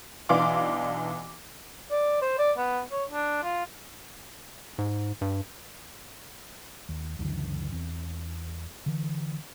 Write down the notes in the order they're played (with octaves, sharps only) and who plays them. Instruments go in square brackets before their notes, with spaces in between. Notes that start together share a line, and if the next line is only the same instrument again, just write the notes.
[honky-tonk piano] B1 E3 D4 F5 C6 D6
[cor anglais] D5
C5
D5
B3
C#5
D4
F4
[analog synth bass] G#2
G2
[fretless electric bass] D#2
C#2 F#2 D3 E3
E2 E3 C4
D3 E3